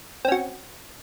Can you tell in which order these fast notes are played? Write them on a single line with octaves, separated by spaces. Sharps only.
C4 C#4 F#4